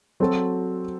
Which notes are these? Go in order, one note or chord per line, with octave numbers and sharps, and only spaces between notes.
F#3 C4 F#4 A4